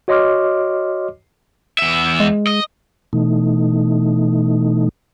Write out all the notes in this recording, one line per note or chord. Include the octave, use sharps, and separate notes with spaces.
F#4 C#5 D#5 C6 D6 F6
E2 E5
G#3
D#5
B2 E3 A3 D#4